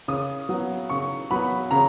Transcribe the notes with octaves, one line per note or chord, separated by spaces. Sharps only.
C#3 D#6
F#3 B3
C#3 C#6
F#3 B3 B5
C#3 A#5